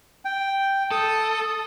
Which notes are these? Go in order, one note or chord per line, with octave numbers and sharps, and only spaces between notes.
G5
A4 D#6